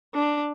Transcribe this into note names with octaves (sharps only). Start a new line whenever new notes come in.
D4